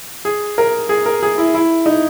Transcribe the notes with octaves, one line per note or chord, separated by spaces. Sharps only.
G#4
A#4
G#4
A#4
G#4
E4
E4
D#4